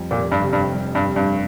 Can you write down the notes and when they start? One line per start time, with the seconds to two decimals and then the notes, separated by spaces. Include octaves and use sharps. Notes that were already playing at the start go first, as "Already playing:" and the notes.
Already playing: F2 G3
0.11 F1 A#2
0.32 G2
0.42 C3
0.53 G2
0.74 G3
0.95 G2
1.05 F2
1.16 G2